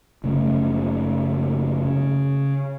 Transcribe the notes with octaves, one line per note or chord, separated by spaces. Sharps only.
F#1 C#3 A3
C#3